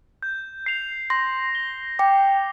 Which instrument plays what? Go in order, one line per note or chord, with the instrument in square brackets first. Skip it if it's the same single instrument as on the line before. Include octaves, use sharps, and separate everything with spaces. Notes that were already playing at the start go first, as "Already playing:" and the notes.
[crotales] G6
C7 F7
[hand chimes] C6 [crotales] A#6
[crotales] G7
[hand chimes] G5 [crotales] D6